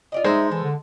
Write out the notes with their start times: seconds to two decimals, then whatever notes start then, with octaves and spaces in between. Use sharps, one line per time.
0.12 F4 D5 D#5
0.24 G#3 D#4 A4 C5 D5 E5
0.52 E3 A4
0.63 D3